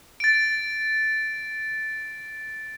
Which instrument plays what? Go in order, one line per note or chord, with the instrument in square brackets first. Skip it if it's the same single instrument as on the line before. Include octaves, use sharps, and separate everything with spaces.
[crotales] A6 D7